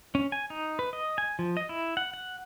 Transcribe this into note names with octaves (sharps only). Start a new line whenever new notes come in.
C#4
G#5
D#4
B4
D#5
G#5
F3
D#5
E4
F#5
F#5